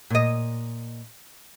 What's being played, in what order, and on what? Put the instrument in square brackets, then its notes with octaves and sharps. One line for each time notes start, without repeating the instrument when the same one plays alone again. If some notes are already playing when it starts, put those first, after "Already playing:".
[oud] A#2 D#5